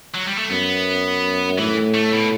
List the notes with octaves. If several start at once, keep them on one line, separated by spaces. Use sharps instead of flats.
F#3
G3
A3
F#2 B3
A2 E3
A3
B2